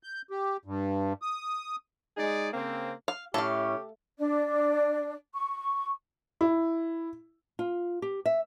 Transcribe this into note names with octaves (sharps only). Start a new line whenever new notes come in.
G6
G4
G2
D#6
G#3 D#4 G#4 D5
C#3 A#3 C4
F5
A2 C#4 G4 A4 F5
D4 D5
C#6
E4
F4
G4
E5